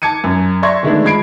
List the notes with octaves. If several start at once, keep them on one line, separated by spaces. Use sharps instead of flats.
A5 D6 G#6 C#7 D#7
F#2
D5 E5 C6 C#6 G#6 A#6
D3 D#3 G#3 A3 B3 D4
F3 G#3 B5 G#6 C7 D7